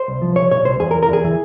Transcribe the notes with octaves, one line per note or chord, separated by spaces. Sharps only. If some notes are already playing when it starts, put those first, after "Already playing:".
Already playing: C5
C2
F3
C2 C#5
A#2 C#5
C2 C5
E2 G#4
A#4
E3
A#4
E2 G#4
E3